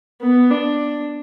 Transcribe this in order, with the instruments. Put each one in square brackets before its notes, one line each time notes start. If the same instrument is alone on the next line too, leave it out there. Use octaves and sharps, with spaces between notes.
[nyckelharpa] B3
D4